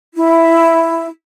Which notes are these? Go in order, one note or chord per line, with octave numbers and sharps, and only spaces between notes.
E4